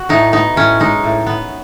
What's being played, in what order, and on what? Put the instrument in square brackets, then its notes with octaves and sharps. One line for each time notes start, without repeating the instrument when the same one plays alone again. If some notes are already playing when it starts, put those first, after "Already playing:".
Already playing: [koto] F#4
A2 D#4
B3 D#4
A2 C#4
G#3 D#4
A2
B3